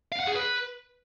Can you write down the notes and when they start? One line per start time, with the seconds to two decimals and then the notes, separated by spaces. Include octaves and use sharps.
0.12 F5
0.20 F#5
0.27 G#4
0.35 B4